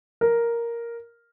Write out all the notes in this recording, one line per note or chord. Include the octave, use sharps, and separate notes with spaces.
A#4